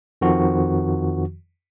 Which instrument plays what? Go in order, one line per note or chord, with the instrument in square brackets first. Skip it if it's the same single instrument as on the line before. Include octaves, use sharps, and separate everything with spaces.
[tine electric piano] F2 D#3 F3 F#4